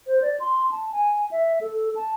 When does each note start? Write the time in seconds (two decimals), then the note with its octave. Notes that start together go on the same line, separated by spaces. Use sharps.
0.07 C5
0.22 D5
0.40 C6
0.71 A5
0.92 G#5
1.31 E5
1.61 A4
1.96 A5